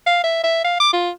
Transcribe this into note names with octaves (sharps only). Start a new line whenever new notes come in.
F5
E5
E5
F5
D6
F4